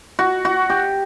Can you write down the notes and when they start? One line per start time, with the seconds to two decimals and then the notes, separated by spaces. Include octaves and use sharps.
0.19 F#4
0.45 F#4
0.70 G4